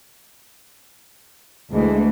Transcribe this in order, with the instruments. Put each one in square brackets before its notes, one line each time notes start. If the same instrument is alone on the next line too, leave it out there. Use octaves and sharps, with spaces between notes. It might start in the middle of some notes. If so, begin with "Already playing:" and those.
[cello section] D2 E3 A3 [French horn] G#3